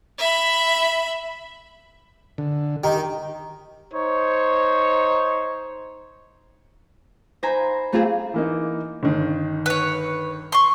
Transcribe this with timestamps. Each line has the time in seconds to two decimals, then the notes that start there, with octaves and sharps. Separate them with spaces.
0.19 E5 B5
2.38 D3
2.84 D#3 G4
3.93 D#4 C5 C#5
7.43 D#4 C5 G#5 A#5 B5
7.92 A3 C4 F4 G4 G#4 C5
8.34 E3 A#3 D#4
9.03 G1 D#3
9.66 B4 C#5
10.52 C6 C#6